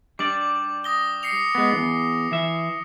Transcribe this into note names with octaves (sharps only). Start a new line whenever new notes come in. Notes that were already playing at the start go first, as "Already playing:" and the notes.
G3 D4 D5 D6
D#6 A#6 G7
C7 C#7 F7
G#3 B3
E2 G#2
E3 E5